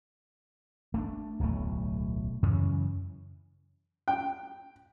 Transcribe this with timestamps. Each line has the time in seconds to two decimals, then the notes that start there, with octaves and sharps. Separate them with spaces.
0.94 A3 C4 D4
1.40 D1 B1 B2 A3
2.43 F#2 C#3 E3 C#4
4.08 G5